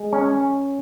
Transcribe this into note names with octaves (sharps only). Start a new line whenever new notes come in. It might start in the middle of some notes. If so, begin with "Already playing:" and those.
Already playing: G#3
C#4